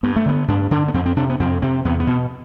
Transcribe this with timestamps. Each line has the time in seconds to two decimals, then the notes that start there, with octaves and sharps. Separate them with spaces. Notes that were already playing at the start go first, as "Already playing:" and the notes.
0.03 G2 B3
0.16 A3
0.26 D3 B3
0.48 G2 D4
0.71 D3 D4
0.88 B3
0.94 F2 C4
1.06 C4
1.16 C3 D4
1.30 B3
1.40 F2 C4
1.62 C3 C4
1.85 E2 B3
2.00 B3
2.07 B2